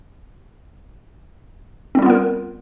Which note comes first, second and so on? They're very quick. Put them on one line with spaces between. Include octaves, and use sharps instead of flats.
C4 G3 F4 B3 A#4